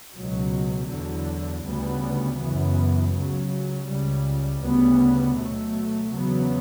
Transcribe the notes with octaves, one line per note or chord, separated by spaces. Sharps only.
C#2 B2 F#3
E2 D3 F#3
D2 C#3 G3 B3
F#2 C#3 E3 B3
C#2 C#3 F#3
C#2 C#3 G3
D2 C#3 G3 B3
B2 F#3 A3
E2 C#3 F#3 B3